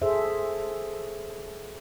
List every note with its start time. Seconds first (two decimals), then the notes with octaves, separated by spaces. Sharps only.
0.02 G#4 A4 C5 E5